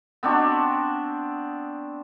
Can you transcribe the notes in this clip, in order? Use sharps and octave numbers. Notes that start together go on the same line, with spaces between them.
B3 C4 D4 F#4